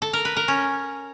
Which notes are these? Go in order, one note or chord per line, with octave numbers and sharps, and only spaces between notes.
A4
A#4
B4
A#4
C#4